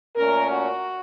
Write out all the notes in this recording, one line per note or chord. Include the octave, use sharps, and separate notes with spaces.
A#2 A3 C#4 A#4
F#4